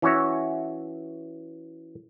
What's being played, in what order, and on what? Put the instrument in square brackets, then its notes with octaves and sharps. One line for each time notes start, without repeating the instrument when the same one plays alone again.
[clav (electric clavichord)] E3 C#4 F#4 C#5 E5